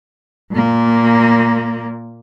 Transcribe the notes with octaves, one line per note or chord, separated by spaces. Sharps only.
A#2 A#3